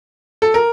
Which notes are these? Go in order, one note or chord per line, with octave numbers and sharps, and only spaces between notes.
A4
A#4